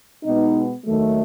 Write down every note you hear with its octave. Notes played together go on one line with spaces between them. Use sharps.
B2 G#3 B3 D#4
D#2 D#3 F#3 A3